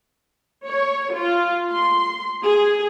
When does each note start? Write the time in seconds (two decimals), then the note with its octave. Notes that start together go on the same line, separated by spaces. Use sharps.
0.65 C#5
1.13 F4
1.71 C6
2.45 G#4